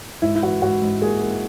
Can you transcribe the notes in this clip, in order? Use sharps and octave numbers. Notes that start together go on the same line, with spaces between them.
G#2 E4
E4
E3 F#4
G#2 F#4
G#2
A#3 G#4
A#3